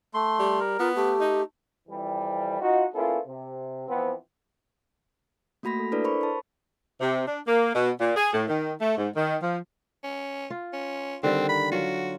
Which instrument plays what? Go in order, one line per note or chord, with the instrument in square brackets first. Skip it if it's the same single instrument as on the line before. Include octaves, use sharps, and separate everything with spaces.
[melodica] A3 C6
[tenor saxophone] G3
[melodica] A#4
[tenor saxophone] B3 [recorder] F4
[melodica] A3 [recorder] G4
[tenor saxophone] D#4
[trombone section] F2 E3 G3
D#4 F4 F#4
A#3 B3 C#4 E4 F4 A4
C3
E3 F3 B3 C4
[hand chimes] A3 A#3 F#4 B5 A#6 B6
A4
D4 E4 A4 B4 D5
A#4 C5 B5 C#6
A5 C#6
[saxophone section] C3
D4
A#3
B2
A#2
G#4
A2
D#3
A3
G#2
D#3
F3
[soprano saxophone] C#4
[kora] F4
[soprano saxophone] C#4
[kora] D3 D#3 G3 [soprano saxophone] C4
[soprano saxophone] B5
[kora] F#3 F4 [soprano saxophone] F#4